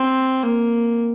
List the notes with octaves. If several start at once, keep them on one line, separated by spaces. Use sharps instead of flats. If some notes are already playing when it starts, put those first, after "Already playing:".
Already playing: C4
A#3